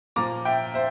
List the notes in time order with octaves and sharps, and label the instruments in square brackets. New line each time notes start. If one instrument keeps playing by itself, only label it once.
[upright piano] A#2 F3 A#5 D6
E5 G5
C5 E5